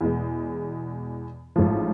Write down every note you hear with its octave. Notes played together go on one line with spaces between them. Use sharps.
E2 B2 G#3
A1 G#2 F3